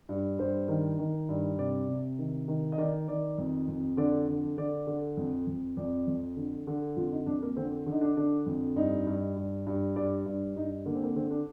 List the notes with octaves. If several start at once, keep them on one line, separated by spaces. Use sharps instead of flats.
G2
G2 C5
D#3
D#3
G2
C3 D5
C3
D#3
D#3
D#5
D#3 D5
D#3 D5
F2
F2
D3 D5
D3
D3 D5
D3
F2
F2
F2 D5
F2
D3
D3
F2 F4
D#4
F2 D4
A#3
D3 C4
D3 D#4
D4
D3 D4
F2
G2 D#4
G2
G2
G2
G2 D5
G2
G2 D#4
D3 A#3
C4
A#3
D3 C4
D4